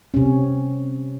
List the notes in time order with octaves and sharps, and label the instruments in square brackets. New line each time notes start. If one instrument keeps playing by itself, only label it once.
[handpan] C3 C#4